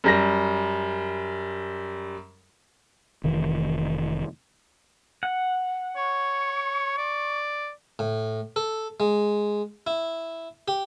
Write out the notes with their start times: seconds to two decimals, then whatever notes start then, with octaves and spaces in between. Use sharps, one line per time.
0.04 F#2 G3 A#6
3.24 F1 D#3 E3
5.23 F#5
5.96 C#5 C#6
6.98 D5
7.99 A2
8.56 A4
9.00 G#3
9.87 E4
10.68 G4